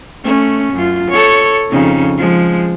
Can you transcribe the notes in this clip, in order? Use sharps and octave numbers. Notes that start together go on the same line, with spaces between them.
A3 C#4
F#2 F4
A4 C#5
F2 C#3 D#4
F3 G#3